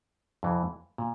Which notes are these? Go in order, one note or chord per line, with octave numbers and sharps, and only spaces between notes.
F2 C3 E3
A#2